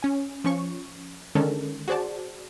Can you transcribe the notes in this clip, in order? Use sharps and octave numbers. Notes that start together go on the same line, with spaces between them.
C#4 G#5
F3 C#4 C#6
D3 D#3 G#3 C#4 A4 A#4
F#4 G#4 C5 D5 A5